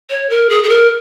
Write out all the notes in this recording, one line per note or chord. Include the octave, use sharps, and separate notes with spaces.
C#5
A#4
G#4
G#4
A#4